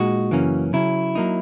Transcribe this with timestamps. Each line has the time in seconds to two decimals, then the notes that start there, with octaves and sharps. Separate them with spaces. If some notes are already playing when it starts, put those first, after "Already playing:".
Already playing: A#2 G#3 D#4 F#4
0.31 F#2 C#3 E3 A#3 C#4
0.73 C#3 F#3 C#4 E4
1.15 F#3 A#3 D#4